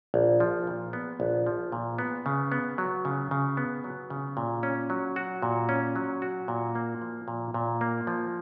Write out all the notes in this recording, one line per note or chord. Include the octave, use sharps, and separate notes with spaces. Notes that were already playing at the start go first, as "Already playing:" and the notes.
A#1
F3
A#2
B3
A#1
F3
A#2
B3
C#3
B3
F#3
C#3
C#3
B3
F#3
C#3
A#2
C#4
F#3
F#4
A#2
C#4
F#3
F#4
A#2
A#3
F3
A#2
A#2
A#3
F3